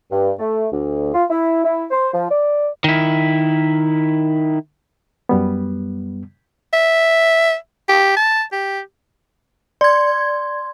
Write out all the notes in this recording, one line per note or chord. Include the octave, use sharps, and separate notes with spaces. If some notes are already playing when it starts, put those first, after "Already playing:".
G2
A3
D2
F4
E4
E4
C5
F3
D5
D#3 E4
F#2 G3 B3
E5
G4
A5
G4
D5 C6 G#6